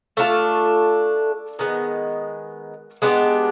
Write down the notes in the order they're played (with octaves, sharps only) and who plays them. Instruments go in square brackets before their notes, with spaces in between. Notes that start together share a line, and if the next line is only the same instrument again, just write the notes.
[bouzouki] A3 D4 F4 A4
D#3 G#3 B3
G#3 B3 D4 G4